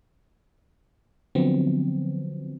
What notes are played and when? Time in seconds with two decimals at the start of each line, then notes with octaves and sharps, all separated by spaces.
1.35 D3 F3 F#3 B3 C4